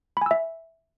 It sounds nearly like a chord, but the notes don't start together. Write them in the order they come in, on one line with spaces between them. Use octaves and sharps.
B5 G#5 E6 E5